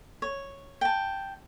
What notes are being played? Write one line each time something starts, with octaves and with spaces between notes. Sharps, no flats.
C#5
G5 A5